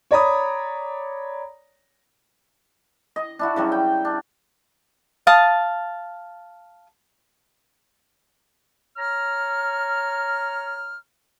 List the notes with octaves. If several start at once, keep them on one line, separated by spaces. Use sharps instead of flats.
C#5 D5 A#5 B5 D#6
D#5
D4 E4 F#4
C#3 F#3 G3
G5
D4
F5 A5 D#6
C#5 A#5 F6